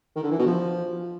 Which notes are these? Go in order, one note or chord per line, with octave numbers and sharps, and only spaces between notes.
D#3
D3
E3
B2
F3